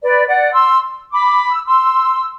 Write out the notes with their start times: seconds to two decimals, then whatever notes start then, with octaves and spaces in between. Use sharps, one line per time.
0.02 B4 D5
0.27 D5 F#5
0.52 C6 E6
1.13 B5 D6
1.51 E6
1.67 C6 E6